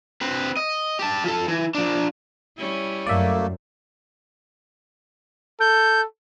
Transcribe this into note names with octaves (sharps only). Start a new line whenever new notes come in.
C4 B4
D#5
G4 A5
F3 A4
E3
F3 D4
G3 C#4 E4
F#2 A3 A#3 D5 E5
A4 G6